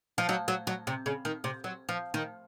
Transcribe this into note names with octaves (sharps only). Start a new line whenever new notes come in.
F3
F#3
F#3
F#3
C3
C#3
D#3
C3
F#3
F3
D#3